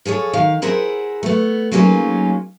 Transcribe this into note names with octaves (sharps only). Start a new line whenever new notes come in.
F3 G#4 A4 C#5
D#3 F5
E4 G#4 A#4 C5 E5 F#5
A3 B3
F#3 G#3 A#3 C#4 D#4 F4